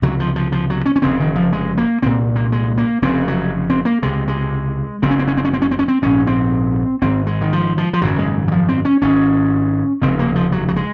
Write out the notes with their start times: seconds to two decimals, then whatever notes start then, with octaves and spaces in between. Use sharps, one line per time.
0.02 C#2 C3 F#3
0.20 F3
0.36 F3
0.52 F3
0.70 F#3
0.86 C#4
0.96 C#4
1.02 F1 D#2 C#3 C4
1.20 D#3
1.36 F3
1.53 G#3
1.78 A#3
2.02 C2 A#2 C4
2.36 A#3
2.52 G#3
2.78 A#3
3.02 F1 F2 C#3 C4
3.28 F#3
3.70 C4
3.85 A#3
4.02 C#2 C3 G#3
4.28 G#3
5.02 F#1 F#2 C#3 C4
5.11 C#4
5.19 C4
5.28 C#4
5.37 C4
5.45 C#4
5.53 C4
5.62 C#4
5.71 C4
5.79 C#4
5.88 C4
6.02 A#1 G#2 C#4
6.27 C4
7.02 G#1 G#2 C4
7.27 G#3
7.41 D#3
7.53 F3
7.78 F3
7.93 F3
8.02 G#1 F#2 C#3 F#3
8.19 G#3
8.48 F#3
8.52 F3
8.69 C4
8.85 C#4
9.02 G#1 G#2 C#4
10.02 F1 D#2 C#3 C4
10.19 A#3
10.35 F3
10.52 F#3
10.68 F#3
10.76 G#3